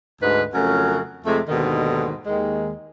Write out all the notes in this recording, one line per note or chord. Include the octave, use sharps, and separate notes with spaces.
D2 G#2 B4
F2 C#3 F#3 A3 C#4 A#4
F2 C3 G#3 A3
D#2 G#2 B2 D3 D#3
D#2 D#3 G#3